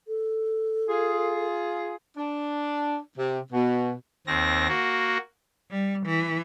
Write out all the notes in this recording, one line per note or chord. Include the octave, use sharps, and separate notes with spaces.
A4
F4 G#4
D4
C3
B2
D#2 C4 A#6
A#3 F#4
G3
E3